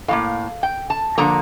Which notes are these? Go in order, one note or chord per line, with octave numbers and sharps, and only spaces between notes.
A2 G3 A#3 F5
G5
A5
D3 F3 A#3 A#5